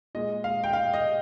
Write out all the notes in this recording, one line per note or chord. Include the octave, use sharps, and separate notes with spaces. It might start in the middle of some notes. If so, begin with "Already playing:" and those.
A#2 G#3 D#5
F5
G5
F5
D#5